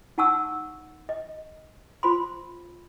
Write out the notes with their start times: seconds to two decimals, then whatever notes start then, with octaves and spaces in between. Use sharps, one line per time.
0.18 D#4 F#5 A5 C#6 E6
1.09 D#5
2.03 F4 C5 B5 C6